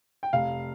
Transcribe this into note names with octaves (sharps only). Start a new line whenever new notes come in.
G5
F1 F5